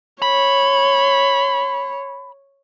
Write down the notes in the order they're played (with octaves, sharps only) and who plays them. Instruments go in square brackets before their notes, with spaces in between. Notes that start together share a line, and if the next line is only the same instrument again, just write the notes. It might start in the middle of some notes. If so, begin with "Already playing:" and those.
[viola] C#5 [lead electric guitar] B5